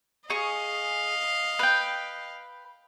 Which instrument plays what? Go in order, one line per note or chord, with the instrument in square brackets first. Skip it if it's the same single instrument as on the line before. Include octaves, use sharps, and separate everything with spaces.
[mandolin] G#4 C#6 [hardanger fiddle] D#5 F5
[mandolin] B4 G5